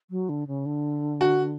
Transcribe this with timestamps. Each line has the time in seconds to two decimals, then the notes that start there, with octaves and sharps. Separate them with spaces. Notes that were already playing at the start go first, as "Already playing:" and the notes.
0.10 F#3
0.29 D3
0.47 C#3
0.66 D3
1.21 F#4